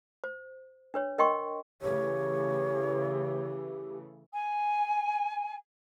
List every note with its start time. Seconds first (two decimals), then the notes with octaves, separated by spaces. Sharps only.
0.24 C5
0.94 D4 B4 C#5
1.18 D4 A#4 D#5 G5 C6 C#6
1.82 C#3 E3 A3 G4 C#5
4.33 G#5